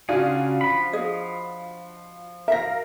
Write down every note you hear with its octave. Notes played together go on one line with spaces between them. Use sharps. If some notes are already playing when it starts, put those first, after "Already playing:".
C#3 D4 F4 F#4 G#4
F3 B5
G#4 D#5
A#4 E5 F5 A#6